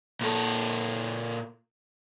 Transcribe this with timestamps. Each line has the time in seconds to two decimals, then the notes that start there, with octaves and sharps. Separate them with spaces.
0.21 A#2 A4